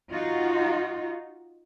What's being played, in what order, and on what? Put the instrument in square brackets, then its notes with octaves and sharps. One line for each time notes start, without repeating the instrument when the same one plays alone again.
[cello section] D#4 F4 F#4